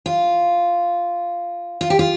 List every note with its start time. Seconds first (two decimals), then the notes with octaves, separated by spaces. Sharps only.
0.06 F4
1.81 F4
1.90 G4
1.99 F4